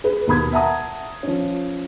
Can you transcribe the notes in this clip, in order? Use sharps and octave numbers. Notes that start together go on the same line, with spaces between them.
G#4 B4
D#2 B2 A#4 B5 D#6 G#6
E5 F#5 A5 A#5 D#6
F3 C#4